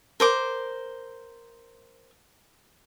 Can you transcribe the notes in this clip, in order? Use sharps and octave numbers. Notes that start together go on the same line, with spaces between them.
A#4 C5 D6